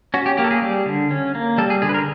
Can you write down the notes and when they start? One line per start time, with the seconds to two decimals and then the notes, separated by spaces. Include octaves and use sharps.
0.14 C#4 F#4
0.26 G4
0.37 A#3 G4
0.44 A4
0.51 G#4
0.62 G3
0.86 D3
1.11 C#4
1.35 A#3
1.58 G3 A4
1.70 G#4
1.82 D3 G#4
1.89 B4
1.94 A#4